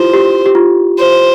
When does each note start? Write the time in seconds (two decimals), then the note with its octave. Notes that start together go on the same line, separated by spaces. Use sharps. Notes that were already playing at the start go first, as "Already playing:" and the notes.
Already playing: E4 F4 G4 C5
0.14 G4
0.46 G4
0.55 F4
0.98 C5